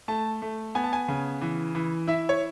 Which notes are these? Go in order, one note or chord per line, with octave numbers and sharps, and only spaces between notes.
A3 A5
A3
B3 G#5
A5
G#5
C#3
E3
E3
E4 E5
C#5